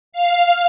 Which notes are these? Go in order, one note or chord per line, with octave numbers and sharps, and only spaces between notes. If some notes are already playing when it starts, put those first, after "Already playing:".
F5